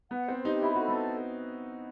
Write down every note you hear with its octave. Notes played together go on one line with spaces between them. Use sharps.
B3 F#5
C4 C5
D#4 G4
E4 B5
F#4 A4
B3